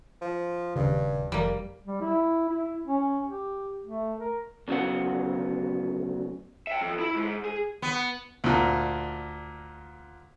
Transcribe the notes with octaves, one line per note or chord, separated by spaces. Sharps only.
F3
D#1 G2 C#3
F1 G3 A#3
G3
E4
E4
C#4
G4
A3
A#4
D2 C#3 F#3 B3 F5 F#5
E5 G5
F2
E4 B5
G#2
G#4
B3
D2 A#2